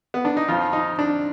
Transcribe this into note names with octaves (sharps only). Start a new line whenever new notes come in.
B3
D4
D#4
F2 F3 F4
D#4
D4